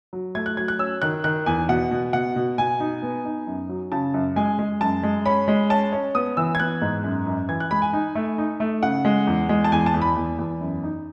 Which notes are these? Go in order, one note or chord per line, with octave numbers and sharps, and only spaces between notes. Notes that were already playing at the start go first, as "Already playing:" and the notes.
F#3
A3 G#6
F#6
F#3 G#6
F#6
C#4 E6
D#3 F#6
D#3 F#6
E2 G#5
B2 F#5
B2
B2 F#5
B2
B2 G#5
D#4
B3
D#4
F#2
F#3
C#3 A5
F#2
G#3 G#5
G#3
F#2 A5
G#3
C#4 B5
G#3
C#4 A5
C#4
B3 D#6
E3 E6
G#6
B3 F#6
G#2
F#2
F#2
E3 G#6
F#6
G#3 B5
G#5
D#4
A3
D#4
A3
C#3 F#5
G#3
E2
G#3
A5
E2 G#5
A5
E2
B5
E2
E2
F#2
D#4